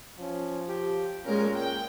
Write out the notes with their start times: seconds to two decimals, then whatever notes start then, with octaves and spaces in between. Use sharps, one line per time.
0.19 F3 C#4
0.69 G4
1.26 A#2 G#3 C#4 A#4
1.55 G5